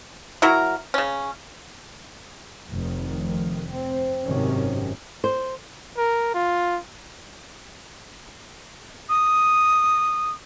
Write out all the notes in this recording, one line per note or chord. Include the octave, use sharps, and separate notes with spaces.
F#3 E4 F#4 A#4
C#3 C#4
F1 D#3
C4
G#1 F#2 C3 D#3 C#4
C5
A#4
F4
D#6